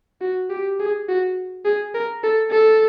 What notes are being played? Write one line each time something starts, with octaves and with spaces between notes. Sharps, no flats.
F#4
G4
G#4
F#4
G#4
A#4
A4
A4